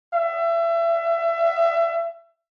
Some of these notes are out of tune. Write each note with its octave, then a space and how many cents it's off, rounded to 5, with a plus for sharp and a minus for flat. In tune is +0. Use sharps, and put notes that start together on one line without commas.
E5 +30